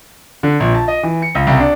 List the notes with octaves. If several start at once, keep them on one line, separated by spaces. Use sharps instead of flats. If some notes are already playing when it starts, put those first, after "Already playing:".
D3
A#1
A5
D#5
E3
C#7
C#2
C2
D4